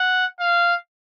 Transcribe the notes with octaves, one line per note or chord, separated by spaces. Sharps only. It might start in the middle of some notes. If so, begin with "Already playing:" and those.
Already playing: F#5
F5